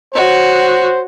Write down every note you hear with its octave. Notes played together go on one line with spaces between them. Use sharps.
F#4 C5 C#5